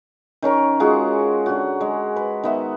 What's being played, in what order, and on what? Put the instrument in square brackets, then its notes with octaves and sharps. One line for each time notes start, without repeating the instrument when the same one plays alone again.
[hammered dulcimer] D#3 C#4 A#4 C#6
G#3 F4 F#4 G#4
D3 F#4
G#3
B4
D#3 B3 E5